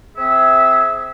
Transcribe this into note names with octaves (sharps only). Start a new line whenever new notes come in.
C4 G#4 E5